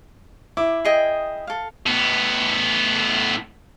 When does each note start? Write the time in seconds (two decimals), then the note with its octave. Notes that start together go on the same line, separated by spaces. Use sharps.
0.57 E4 D6
0.85 G#4 D#5 G5
1.47 A4 F5
1.86 A2 B3